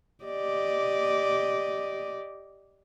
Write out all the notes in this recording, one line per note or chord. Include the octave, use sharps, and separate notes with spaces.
G4 D5 D#5